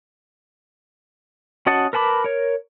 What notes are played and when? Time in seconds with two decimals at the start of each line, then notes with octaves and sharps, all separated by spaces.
1.67 C#4 F#4 D#5 F#5 A5
1.93 A#4 B4 A5 B5 D6
2.24 A#4 C#5